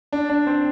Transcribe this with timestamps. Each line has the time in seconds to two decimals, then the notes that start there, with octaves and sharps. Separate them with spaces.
0.13 D4
0.30 D4
0.47 C4